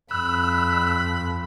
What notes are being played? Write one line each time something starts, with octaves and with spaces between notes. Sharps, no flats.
F2 B5 E6 F#6